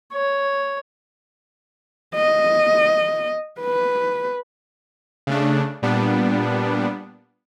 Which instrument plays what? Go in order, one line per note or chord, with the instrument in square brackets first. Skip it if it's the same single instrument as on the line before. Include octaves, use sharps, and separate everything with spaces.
[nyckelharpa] C#5
[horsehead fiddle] D#5
B4
[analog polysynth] C#3 A3 D4
A#2 G3 B3 D4